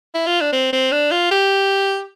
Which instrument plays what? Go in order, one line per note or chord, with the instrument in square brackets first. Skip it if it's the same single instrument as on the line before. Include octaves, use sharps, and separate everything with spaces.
[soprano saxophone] E4
F4
D4
C4
C4
D4
F4
G4